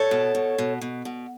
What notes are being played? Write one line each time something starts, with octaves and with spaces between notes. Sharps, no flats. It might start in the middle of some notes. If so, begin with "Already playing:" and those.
Already playing: A4 C#5
B2
B2
B2
B2
B2